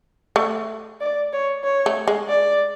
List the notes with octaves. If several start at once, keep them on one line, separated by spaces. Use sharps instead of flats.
A3
D5
C#5
C#5
A3
G#3
D5